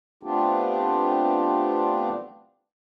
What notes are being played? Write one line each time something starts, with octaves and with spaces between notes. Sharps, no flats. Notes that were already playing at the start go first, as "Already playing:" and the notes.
A3 B3 C4 D4 F4 G4